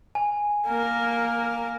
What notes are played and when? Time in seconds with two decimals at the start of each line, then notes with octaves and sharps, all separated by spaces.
0.15 G#5
0.67 A#3 A#4